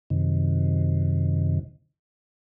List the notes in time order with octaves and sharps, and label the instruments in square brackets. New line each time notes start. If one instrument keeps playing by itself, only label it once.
[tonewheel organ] F#2 C3 D#3